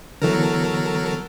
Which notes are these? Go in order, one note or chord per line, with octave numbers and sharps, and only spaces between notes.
D3 E3 F#3 B3 A4 A#4